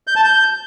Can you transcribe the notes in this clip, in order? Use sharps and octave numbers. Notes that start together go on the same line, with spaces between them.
G6
A5
G6